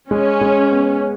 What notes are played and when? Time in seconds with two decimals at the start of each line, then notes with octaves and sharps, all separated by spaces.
0.11 G#3 C#4
0.41 G#3
0.72 B3